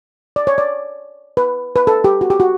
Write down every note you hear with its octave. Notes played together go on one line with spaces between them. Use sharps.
D5
C#5
D5
B4
B4
A4
G4
F#4
G4
F#4